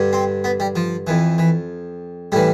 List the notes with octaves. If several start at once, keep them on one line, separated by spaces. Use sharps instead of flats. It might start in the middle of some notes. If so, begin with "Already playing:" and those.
Already playing: G2 D3
C4
B3
G3
F3
F2 E3
E3
A2 E3 G3